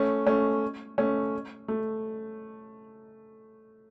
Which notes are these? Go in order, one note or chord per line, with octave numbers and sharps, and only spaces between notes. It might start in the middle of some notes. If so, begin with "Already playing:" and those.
Already playing: A3 C#4
A3 C#4
A3 C#4
A3